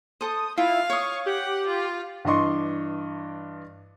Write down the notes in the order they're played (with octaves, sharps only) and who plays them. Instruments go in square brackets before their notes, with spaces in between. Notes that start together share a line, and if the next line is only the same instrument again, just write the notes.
[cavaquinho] A4 C5 [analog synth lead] D#6
[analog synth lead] E4 [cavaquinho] F4 [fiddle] F5
[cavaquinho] C#5 D#6 [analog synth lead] C#6
[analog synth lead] G4 [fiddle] F#5
[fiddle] F4
[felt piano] G2 E3 D4 D#5 C6 C#6